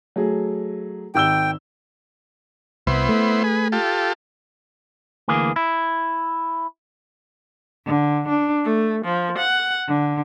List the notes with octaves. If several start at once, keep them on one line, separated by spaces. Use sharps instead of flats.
F#3 A3 G#4
G#1 G5 E6 G7
C2 B3 E4 C5
A3
G#4 B4
F4 G4 A4
D2 E3 A#3 G#4
E4
D3
D4
A3
F3
F#5
D3